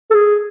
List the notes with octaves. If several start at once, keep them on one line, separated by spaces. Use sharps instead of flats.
A4
G#4